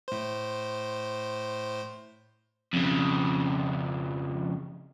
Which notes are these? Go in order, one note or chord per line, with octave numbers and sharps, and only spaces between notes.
A2 C5
F2 C#3